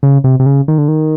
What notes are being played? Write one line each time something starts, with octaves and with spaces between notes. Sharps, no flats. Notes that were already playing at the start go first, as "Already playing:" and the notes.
C#3
C3
C3
C#3
D#3
D3
D#3